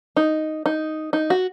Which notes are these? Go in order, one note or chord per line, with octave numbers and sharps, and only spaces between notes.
D#4
D#4
D#4
F#4